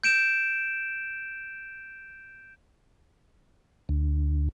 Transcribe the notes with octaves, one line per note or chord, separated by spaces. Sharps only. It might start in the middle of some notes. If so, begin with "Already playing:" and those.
G6 D7 E7
D2